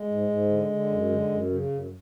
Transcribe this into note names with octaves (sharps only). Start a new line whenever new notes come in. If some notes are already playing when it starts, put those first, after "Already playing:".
Already playing: G#3
G#2
G#2
D3
D3
F#2
D3
F#2
C#3
F#2